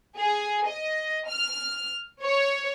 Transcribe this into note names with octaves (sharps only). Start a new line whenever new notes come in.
G#4
D#5
F6
C#5